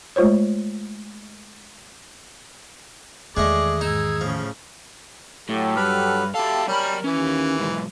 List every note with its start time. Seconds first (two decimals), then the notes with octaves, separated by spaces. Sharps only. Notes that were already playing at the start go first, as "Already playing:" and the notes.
0.16 G#3 A3 F4 C5 C#5
3.37 E2 D#3 G#3 A3 G#4 D5 D#5
3.81 G#2 D#4 E6 G#6
4.21 A2 C#3 F3
5.49 A2 F#3 G4 A4
5.77 G2 B4 F6
6.35 E4 G4 A4 F5 A5
6.68 F#3 G3 C#4 A#4 B5
7.04 D#2 E3 C#4
7.60 B1 G#2